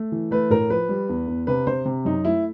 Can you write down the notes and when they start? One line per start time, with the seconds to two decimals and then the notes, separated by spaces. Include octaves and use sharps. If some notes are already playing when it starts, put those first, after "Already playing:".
Already playing: A3
0.12 E3
0.31 A3 B4
0.50 A2 A#4
0.70 F3 B4
0.89 G3
1.09 E2
1.28 E2
1.47 C3 B4
1.67 C3 C5
1.85 C3
2.05 F#2 D#4
2.25 A3 E4